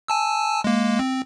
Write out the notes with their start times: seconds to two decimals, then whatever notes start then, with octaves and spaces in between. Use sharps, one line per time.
0.08 G#5 A5 E6
0.64 G#3 A#3
0.99 C4